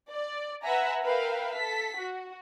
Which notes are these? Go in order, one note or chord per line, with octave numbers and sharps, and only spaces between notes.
D5
B4 E5 F#5 G#5 A#5
A#4 B4 E5 F5 G5
A4 B6
F#4